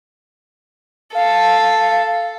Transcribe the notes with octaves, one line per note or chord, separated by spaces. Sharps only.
A4 F5